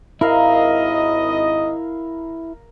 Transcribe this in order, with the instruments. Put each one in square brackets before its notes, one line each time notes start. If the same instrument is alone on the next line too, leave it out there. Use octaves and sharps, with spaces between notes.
[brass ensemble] G#1 D#5 [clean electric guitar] E4 [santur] A#4 F5 A#5